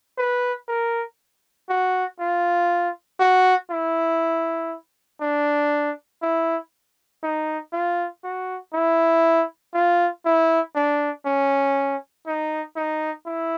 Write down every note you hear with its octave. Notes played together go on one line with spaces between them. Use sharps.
B4
A#4
F#4
F4
F#4
E4
D4
E4
D#4
F4
F#4
E4
F4
E4
D4
C#4
D#4
D#4
E4